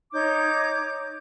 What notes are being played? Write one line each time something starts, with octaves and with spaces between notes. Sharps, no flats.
D#4 C#5 D6 G6